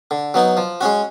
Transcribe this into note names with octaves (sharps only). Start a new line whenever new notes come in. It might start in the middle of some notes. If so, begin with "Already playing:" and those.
D3
F#3 B3 D#4
F3
G#3 C#4 F#4